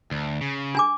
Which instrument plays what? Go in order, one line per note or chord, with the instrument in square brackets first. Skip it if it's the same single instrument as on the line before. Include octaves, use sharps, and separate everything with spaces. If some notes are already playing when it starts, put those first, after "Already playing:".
[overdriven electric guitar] D2
C#3
[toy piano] D4 G#5 D6